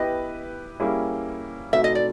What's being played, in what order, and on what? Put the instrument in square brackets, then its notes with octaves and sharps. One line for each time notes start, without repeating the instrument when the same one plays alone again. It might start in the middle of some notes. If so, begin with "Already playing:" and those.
Already playing: [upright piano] B3 E4 G4 B4 [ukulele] D#5
[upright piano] G3 A#3 C#4 E4 G#4
[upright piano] B2 F#3 A3 C4 D#4 [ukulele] E5
[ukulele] D#5
D5